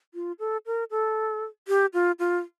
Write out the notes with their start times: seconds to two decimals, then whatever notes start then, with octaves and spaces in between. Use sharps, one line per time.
0.14 F4
0.39 A4
0.66 A#4
0.91 A4
1.68 G4
1.94 F4
2.19 F4